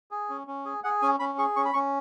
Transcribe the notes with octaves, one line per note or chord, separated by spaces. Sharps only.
G#4
C#4
C#4
G#4
G#4 F#5
C#4 G#5
C#4 B5
G#4 C#6
C#4 C#6
B5
C#4 C#6